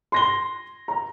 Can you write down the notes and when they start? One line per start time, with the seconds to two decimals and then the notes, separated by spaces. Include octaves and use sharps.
0.12 C6 A#6 G7
0.88 A#5